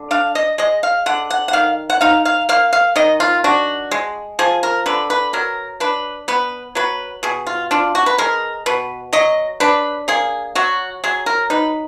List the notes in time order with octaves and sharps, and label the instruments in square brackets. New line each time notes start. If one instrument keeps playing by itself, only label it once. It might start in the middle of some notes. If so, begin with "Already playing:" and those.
Already playing: [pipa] D3
D4 F5
D#5
G#3 D#5
F5
D3 F#5
F#5
F#5
D#3 F5
F#5
D#4 F5
F5
A#3 F5
F5
D#3 D#5
F4
D4 F#4
G#3
F3 G#4
A#4
D3 B4
B4
F#3 A#4
D4 B4
B3 B4
F#3 B4
B2 G#4
F4
D4 F4
F#4
B4
G#3 A#4
B2 B4
F#3 D#5
D4 B4
A#3 G#4
F#3 F#4
F#3 G#4
A#4
D#4 B4